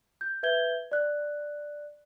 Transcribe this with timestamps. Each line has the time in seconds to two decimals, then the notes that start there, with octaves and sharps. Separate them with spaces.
0.21 G6
0.43 B4 E5 G6 G#6 G7
0.92 D5 F#6